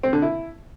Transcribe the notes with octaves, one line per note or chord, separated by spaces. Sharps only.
C4
D3
E4